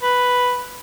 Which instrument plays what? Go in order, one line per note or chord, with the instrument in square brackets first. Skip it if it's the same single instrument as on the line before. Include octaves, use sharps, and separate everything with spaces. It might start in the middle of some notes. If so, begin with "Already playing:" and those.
[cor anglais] B4